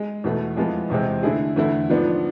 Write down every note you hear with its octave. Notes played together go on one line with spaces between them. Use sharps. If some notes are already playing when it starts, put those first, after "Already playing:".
Already playing: G#3
E2 B2 A3
F2 E3 G#3 B3 F4
E2 C3 G#3 C4
D3 A3 E4 G#4
E2 D3 A3 E4
G#2 F3 B3 D4